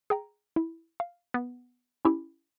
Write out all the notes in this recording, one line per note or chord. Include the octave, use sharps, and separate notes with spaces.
G#4 G5 A#5
E4
F5
B3
C#4 E4 G4